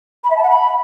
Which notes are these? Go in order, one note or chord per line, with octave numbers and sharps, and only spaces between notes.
B5
E5
A5
F#5
B5